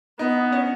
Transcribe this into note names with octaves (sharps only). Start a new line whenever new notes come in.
B3 D#4
C#4